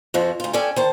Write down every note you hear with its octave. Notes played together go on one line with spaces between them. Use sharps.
F2 C#3 F3 F#4
D2 F4
C#4 A4 D5 G5 G#5
D#3 C5 A5